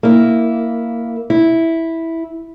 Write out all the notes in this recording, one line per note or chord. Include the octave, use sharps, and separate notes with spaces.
A#3 E4
E4